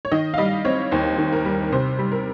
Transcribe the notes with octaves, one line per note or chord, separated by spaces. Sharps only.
C#5
D#3 D#5
F5
G3 D#5
C4 C#5
D#2 C5
D#3
A#4
G3
C3 C5
G3
A#4